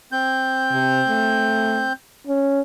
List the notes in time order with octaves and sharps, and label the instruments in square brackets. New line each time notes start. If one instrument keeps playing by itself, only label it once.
[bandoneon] C4 G6
[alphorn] C3
A3
C#4